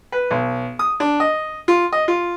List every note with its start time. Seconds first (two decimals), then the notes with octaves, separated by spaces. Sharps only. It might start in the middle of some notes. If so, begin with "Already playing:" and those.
0.12 B4
0.31 B1
0.79 D#6
1.00 D4
1.20 D#5
1.68 F4
1.92 D#5
2.08 F4